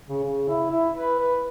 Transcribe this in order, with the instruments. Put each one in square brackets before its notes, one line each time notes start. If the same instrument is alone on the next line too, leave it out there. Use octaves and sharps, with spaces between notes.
[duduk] C#3
C#3
E4
E4
B4
B4